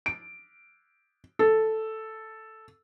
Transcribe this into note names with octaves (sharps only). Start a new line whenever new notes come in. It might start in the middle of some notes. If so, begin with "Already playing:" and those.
D7
A4